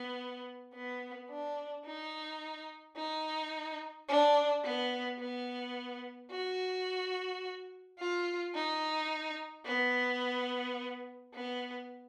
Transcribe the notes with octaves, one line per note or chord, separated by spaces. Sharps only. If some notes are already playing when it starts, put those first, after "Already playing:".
Already playing: B3
B3
D4
D#4
D#4
D4
B3
B3
F#4
F4
D#4
B3
B3